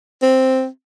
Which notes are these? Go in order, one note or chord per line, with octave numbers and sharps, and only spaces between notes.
C4